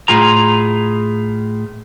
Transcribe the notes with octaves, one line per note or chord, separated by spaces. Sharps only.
A2 F4 G#4 A#5